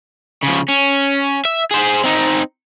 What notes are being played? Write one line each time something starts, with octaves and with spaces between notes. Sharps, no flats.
C#3 F3
C#4
E5
G#4 C5
C4 D#4